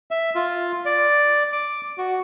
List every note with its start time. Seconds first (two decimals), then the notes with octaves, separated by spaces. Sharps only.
0.11 E5
0.35 F4
0.85 D5
1.52 D6
1.98 F#4